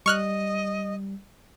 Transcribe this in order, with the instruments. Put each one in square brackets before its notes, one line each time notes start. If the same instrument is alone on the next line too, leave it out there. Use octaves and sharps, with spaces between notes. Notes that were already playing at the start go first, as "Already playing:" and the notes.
[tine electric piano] G3 [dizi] D#5 [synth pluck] C#6 F6 F#6